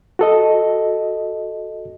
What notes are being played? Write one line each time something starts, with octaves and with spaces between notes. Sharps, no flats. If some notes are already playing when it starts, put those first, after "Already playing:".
F#4 A4 D#5